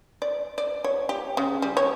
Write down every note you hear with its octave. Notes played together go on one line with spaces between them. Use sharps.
D5
D5
C#5
G4
C#3
G3
C#5